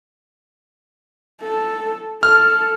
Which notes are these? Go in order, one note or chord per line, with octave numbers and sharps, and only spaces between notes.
A4
A4 F6